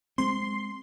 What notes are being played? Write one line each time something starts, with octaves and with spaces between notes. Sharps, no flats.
G#3 C4 C6